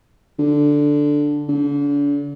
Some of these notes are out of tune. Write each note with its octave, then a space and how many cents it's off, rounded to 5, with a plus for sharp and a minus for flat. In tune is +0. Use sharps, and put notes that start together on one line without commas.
D3 +0
D3 -40